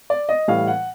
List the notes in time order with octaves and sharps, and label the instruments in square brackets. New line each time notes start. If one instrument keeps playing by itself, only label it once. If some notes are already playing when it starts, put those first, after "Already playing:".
[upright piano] D5
D#5
A2 E3 G3 F5
F#5